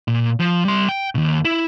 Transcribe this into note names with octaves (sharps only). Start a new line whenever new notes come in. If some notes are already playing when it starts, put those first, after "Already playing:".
A#2
F3
G3 C6
G5
D#2 B2
E4